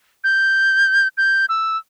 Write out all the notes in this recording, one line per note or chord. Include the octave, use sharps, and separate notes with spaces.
G6
G6
E6